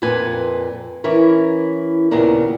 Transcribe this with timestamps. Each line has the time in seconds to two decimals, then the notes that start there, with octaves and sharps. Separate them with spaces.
0.02 F2 A#2 C4 B4 G#5
1.04 E3 C#4 E4 A#4
2.11 D#2 A#2 C#3 B3 A#4 D5